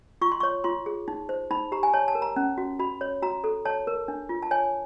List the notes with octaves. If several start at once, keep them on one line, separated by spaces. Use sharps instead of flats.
F4 C#6
C6
C#6
C#5
F4 C6
G#4
D#4
C5
D#4 B5
G4 A#5
G#5
C#5 A5
A5
A#4
A#5
C#4
F#4
F#4 B5
C#5
F#4 A#5
A4
C#5 A5
A#4
D4
F4
A5
C#5 G#5